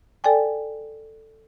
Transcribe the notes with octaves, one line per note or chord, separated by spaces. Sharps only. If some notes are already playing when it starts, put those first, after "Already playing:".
A4 D5 G5 G#5